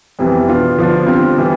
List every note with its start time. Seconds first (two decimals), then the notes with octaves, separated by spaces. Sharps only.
0.19 F2 C3 E3 G3 B3
0.48 B2 B3 D4 F4
0.78 D3 F3 B3 D4 F4
1.07 D3 G3 C4 F4
1.38 E3 G3 B3